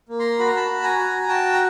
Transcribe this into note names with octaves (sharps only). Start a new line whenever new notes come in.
A#3
A#5 C6
F#4 B5
A#5
A5 B5
F#4
G#5 A#5
F#4
F#4 G5 A5
A#5